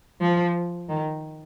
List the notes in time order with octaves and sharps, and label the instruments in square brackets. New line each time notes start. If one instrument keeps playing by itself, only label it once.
[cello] F3
D#3